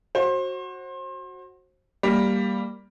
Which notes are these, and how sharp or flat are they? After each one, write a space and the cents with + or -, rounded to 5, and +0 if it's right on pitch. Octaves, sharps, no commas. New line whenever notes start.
F#4 +0 C5 +30
G3 +5 A#3 +0